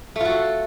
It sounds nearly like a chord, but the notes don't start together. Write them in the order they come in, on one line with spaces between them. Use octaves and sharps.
A3 F4 F#4 A4